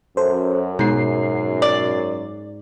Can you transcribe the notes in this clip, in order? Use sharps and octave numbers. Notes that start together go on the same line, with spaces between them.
F#2 A4 C5
G#2 B2 C7
D5